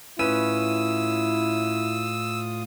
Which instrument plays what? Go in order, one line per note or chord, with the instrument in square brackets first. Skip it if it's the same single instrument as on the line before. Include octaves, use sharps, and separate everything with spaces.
[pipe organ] A2 F4 D#6 [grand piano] C#4 B4 D#7 [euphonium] E4 [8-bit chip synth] E6